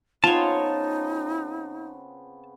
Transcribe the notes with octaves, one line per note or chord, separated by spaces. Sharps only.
C#3 B3 C4 D#4 F4 C#5 A5